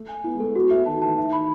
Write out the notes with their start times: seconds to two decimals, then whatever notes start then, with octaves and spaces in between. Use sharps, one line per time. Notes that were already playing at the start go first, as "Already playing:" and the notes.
Already playing: A3
0.09 G#5
0.24 B3 E4
0.35 G#3
0.40 A3 A4
0.55 B3 F#4
0.71 A3 E5
0.86 D#3 A5
1.02 E3 A5
1.18 D#3 E5
1.33 B5